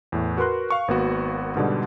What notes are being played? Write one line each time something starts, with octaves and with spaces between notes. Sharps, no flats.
E2 A2
F#4 A#4 B4 C6 F#6
F5 C#6
G#1 A#3 B3 F#4
G#2 B2 D3 G3